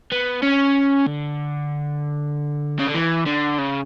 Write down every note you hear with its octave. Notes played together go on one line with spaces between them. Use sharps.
B3
C#4
D3
C#3
D3
E3
D3
C#3